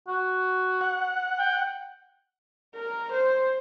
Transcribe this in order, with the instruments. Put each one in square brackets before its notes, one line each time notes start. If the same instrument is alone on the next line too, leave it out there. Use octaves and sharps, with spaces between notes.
[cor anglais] F#4
[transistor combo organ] F#5
[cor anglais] G5
[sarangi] A#4
C5